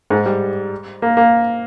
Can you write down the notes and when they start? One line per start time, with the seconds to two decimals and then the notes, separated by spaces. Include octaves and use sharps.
0.10 G#2
0.26 G3
1.02 A#3
1.17 A#3